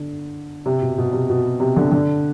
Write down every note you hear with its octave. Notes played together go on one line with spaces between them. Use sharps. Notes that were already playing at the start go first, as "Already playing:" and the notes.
Already playing: D3
C3
B2
B2
C3
B2
C3
D3
D3